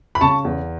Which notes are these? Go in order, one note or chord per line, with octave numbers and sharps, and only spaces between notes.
B5
C#3 A5 C#6
E2